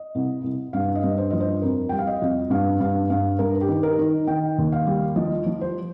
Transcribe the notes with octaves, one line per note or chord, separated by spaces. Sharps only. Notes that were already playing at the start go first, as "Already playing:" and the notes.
Already playing: D#5
C2
C2
G2 F5
D#5
G2
C5
F3 D#5
C5
F2 A#4
G3 G5
F5
D#5
F2
G2 F5
G2 F5
G2 F5
G2 A#4
G4
D#3
A#4
D#3
D#3 G5
D#2
F5
G3
F3 D#5
F3
C5